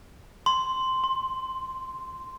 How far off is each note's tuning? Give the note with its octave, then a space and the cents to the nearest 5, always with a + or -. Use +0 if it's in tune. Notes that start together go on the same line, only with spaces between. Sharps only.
C6 -5
C6 +20